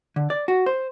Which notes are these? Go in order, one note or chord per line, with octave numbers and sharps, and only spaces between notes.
D3
D5
F#4
C5